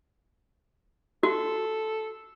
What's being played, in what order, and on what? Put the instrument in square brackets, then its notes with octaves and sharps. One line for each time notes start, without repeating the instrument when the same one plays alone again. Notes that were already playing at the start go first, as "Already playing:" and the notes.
[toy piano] F#4 [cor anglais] A4